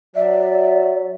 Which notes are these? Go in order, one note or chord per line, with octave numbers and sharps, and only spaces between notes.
F#3 D5 E5